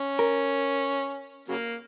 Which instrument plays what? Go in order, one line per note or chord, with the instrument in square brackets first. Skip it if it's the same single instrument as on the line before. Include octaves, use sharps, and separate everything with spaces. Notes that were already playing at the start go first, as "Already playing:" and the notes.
Already playing: [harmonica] C#4
[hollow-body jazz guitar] A#4
[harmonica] C#3 F#3 A#3